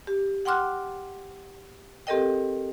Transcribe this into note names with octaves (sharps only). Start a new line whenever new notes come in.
G4
F#5 G5 C6 D6 F6 F#6
C4 G4 A4 A#4 D#5 G5